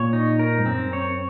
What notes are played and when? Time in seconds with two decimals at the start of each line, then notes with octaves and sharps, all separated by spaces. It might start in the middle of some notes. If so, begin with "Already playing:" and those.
Already playing: A#2 C#5
0.13 D#4
0.39 A#4
0.58 G#2
0.66 F#2 C4
0.93 C#5